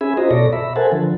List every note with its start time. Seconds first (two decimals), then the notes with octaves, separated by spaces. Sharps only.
0.01 C#4 G#4 E5 G#5 B5
0.17 F4 F#4 C5 D#5 A#5
0.31 B2 A4 C#5 D5 A#6
0.53 E5 B5
0.76 A4 A#4 C5 F#5 G#5 A5
0.92 D3 F3